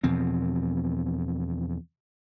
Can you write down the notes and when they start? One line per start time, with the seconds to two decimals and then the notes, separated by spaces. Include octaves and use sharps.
0.04 E2 B2 F3 C4